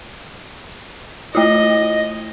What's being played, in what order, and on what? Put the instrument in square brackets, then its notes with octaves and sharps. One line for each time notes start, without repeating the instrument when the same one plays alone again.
[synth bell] A3 E4 F4 [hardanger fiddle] D#5